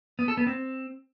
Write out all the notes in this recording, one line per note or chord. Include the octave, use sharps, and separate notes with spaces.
B3
A4
B3
C4